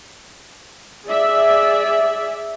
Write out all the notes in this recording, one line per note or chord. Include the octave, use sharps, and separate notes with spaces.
G#4 D5 E5